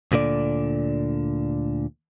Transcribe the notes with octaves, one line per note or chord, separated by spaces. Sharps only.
D2 A#2 D3 D5